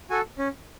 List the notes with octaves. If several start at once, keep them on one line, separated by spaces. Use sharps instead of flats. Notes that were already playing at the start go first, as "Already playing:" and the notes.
F#4 A4 G#5
C#4